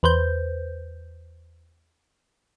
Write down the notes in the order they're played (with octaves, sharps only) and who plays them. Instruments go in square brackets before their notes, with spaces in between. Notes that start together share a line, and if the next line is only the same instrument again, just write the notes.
[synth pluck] E2 B4 C5 G6